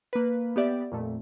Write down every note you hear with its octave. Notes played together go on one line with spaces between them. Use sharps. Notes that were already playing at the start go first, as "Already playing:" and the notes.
A#3 B4
B3 G4 D5 E5
F2 A#2 A3